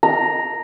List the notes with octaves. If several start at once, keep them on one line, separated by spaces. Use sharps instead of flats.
A#5